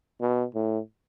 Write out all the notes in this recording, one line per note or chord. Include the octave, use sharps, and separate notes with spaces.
B2
A2